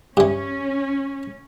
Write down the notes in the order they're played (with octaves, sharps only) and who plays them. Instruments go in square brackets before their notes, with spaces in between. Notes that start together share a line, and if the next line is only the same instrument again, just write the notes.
[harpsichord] G2 E3 [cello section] C#4